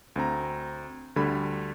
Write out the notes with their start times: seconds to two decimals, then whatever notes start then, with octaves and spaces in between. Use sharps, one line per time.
0.16 D2 C4 A#5
1.16 D2 D3 G3 B5